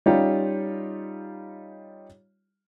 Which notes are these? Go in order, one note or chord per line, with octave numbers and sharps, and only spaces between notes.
G3 C#4 D#4 F4 G4